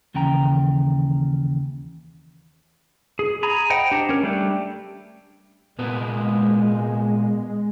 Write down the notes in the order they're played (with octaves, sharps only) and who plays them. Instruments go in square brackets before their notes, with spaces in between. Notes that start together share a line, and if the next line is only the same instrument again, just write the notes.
[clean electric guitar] D#2 C#3 E3 G5 A#5
[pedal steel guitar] G#4
G#4 A#5 B5
C5 D#5 F#5 G5 A#5
D4 G4 C5
C#4 A#4
G3 A3 D4 G4
[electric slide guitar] A#2 A#3 B3 [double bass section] G#3